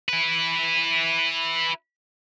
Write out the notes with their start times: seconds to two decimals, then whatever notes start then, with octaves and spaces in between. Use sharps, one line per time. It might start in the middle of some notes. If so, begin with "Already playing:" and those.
0.08 E4 B4